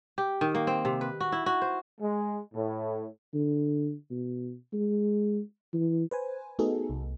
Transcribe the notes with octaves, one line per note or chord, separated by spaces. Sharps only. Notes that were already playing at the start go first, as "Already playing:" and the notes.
G4
D#3
A#3
C4
C3
B4
F#4
E4
F#4
C5
G#3
A2
D3
B2
G#3
E3
B4 C5 G#5
A3 B3 D#4 F#4 G#4 A4
C2